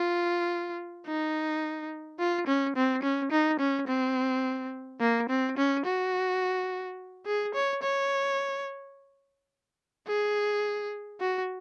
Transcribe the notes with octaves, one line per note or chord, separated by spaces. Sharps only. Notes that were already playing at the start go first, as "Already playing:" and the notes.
Already playing: F4
D#4
F4
C#4
C4
C#4
D#4
C#4
C4
A#3
C4
C#4
F#4
G#4
C#5
C#5
G#4
F#4